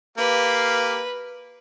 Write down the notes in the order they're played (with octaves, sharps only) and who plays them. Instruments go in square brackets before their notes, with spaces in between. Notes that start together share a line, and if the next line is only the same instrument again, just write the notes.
[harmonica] A#3 G4 F5 [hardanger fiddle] B4